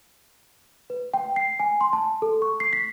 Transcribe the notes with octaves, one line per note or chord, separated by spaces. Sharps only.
B4
G5
C7
G#5
C6
A5
A4
C#6
C7
B6